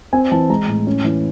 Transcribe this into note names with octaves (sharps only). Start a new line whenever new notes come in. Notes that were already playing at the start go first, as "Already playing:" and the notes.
C4 G#5
E3 A5
G#3 A#5
A2
C#4
E3